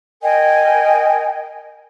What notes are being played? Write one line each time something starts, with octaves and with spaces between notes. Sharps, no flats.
A#4 D#5 G5 G#5